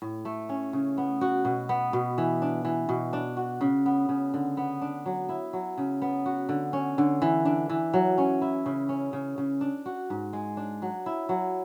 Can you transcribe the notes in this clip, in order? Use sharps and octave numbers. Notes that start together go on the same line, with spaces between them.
A2
A3
C#4
C#3
B3
F#4
B2
B3
B2
E3
D4
E3
B2
D4
F#4
C#3
B3
C#3
D3
B3
D4
F#3
E4
F#3
C#3
B3
F#4
D3
C#4
D3
E3
D4
E3
F#3
C#4
E4
C#3
C#4
C#3
C#3
D4
F#4
G#2
G#3
D4
F#3
E4
F#3